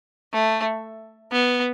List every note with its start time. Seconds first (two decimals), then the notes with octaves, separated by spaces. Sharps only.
0.33 A3
1.32 B3